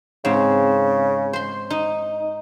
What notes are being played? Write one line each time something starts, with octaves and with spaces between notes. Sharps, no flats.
G#2 C#3 C4
C5 C6
D#4